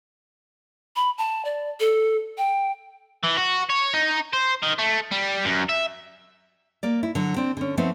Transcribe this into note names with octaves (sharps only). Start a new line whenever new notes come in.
B5
A5
D5
A4
G5
E3
F#4
C#5
D#4
C5
D#3
A3
G3
F#2
E5
A#3 D5
E4
D3 F#3
C4 D4
D3 C#4
F3 A3 B3 C4 D#4